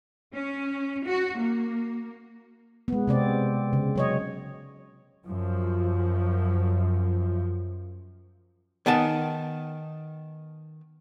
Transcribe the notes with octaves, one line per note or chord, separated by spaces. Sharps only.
C#4
F#4
A#3
G#3 B3
C3 C4 D5
C#3
F#3 C#5 D#5
F#2 F3
D#3 B3 G#5 A5